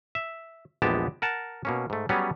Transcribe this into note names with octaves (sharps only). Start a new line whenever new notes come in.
E5
A#1 E2 G#3 B3 G4 A5
A#4 F#5 A5
B2 A#3 C#4
G#2 A3
F#3 G3 B3 C#4 G#4